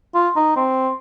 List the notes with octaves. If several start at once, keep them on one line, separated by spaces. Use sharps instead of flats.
F4
D#4
C4